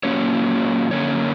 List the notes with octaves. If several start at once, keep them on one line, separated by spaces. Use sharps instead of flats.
A#2 F#3 A#3 C#4 C#5
F#2 D3 A#3 C#4 C#5